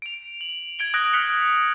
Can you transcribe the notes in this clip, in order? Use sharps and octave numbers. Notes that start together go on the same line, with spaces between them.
D7 F7
F#7
G#6 D7 G7
D#6 F#6 G#6 A#6 D7
F6 F#6 B6 C#7 F7 G7